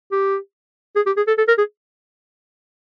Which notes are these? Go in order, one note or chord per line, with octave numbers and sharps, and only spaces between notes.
G4
G#4
G4
G#4
A4
A4
A#4
G#4